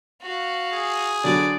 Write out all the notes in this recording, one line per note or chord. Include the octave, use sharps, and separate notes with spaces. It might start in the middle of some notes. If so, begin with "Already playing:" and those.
F#4 F5
G#4
D3 F#3 D5